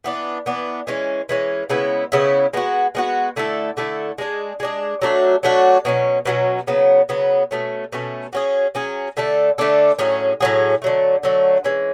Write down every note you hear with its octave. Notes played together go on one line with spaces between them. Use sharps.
E3 B3 D4
E3 B3 D4
E3 G#3 C#4
E3 G#3 C#4
C#3 G#3 B3 E4
C#3 G#3 B3 E4
G#3 B3 D4 F#4
G#3 B3 D4 F#4
D3 A3 E4 A4
D3 A3 E4 A4
G#3 D4 G#4
G#3 D4 G#4
F#3 A3 D4 F#4
F#3 A3 D4 F#4
B2 F#3 C#4
B2 F#3 C#4
C#3 F#3 B3
C#3 F#3 B3
B2 A3 C#4
B2 A3 C#4
F#3 C#4 G#4
F#3 C#4 G#4
D3 A3 D4 A4
D3 A3 D4 A4
A2 F#3 C#4 G#4
A2 F#3 C#4 G#4
D3 F#3 A3
D3 F#3 A3
E3 G#3 C#4